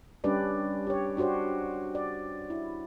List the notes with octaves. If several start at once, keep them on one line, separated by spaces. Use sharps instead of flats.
G3 C#4 D4 G4 B4 D5
G4 C#5
D4 F#4 G4 C5 C#5
D5
E4